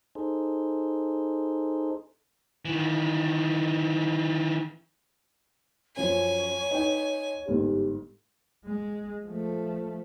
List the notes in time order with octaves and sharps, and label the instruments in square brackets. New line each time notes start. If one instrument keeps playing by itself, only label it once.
[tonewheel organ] D#4 G#4 A4 C5
[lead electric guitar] D#3 E3
[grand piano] F#2 F3 C#4 [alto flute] C#5 [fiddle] G#5
[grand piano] D#4 B4 G5
[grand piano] G1 G#2 [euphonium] G4
[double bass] G#3
F3 A3